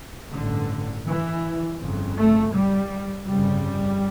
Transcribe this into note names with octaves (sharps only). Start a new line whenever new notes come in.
A1 G2 D3
E3
G1 F2 C#3
A3
G3
G1 F2 C#3 G3